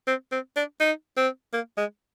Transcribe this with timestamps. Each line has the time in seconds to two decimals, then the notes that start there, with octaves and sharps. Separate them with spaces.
0.07 C4
0.32 C4
0.56 D4
0.80 D#4
1.17 C4
1.53 A#3
1.77 G#3